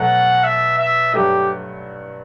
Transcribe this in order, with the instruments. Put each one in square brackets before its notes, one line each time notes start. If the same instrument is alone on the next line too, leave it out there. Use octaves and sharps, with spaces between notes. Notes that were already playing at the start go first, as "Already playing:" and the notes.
Already playing: [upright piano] B2 F#3 A3 [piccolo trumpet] F#5
[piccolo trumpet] E5
E5
[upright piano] G2 F#3 A3 [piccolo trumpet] G4